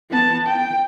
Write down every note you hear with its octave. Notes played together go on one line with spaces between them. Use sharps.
B3 A5
G5